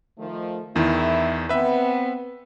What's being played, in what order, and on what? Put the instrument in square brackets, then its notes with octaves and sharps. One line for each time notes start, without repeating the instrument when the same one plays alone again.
[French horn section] D#3 F3 A3
[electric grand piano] E2 D#3 [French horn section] E4
[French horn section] B3 C4 [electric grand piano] B4 E5